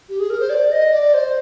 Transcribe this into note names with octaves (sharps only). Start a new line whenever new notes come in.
G4
G#4
A#4
C5
D5
D#5
D5
C5